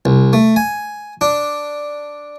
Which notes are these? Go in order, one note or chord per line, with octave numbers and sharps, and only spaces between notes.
C2
A3
G#5
D4